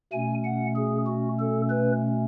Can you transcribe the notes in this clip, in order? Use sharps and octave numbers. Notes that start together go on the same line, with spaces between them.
B2 A3 C#4 G#5
F#5
G#4
F#4
A4
B4